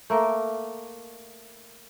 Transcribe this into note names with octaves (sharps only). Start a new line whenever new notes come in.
A3 A#3 A#4